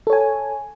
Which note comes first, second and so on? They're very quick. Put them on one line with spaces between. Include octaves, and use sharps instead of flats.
A4 C#5 G#5